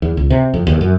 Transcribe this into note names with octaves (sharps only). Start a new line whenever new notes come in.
E2
C#2
C3
F2
D#2
F#2